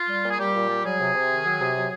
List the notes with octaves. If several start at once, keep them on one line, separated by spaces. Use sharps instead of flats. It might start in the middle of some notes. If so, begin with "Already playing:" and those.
Already playing: F4
G3
A#2
G#4
G3 G4
A#2
G3
F#3 G#4
C3
C3
D#3
F#3
C3
F#3